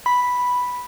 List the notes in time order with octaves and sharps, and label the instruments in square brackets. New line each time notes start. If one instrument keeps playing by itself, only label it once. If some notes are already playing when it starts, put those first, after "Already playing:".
[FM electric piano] B5